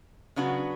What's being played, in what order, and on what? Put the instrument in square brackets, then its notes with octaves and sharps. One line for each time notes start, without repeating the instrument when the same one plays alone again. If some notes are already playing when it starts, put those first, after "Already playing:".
[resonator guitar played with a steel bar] C#3 F#3 B3 D4 F#4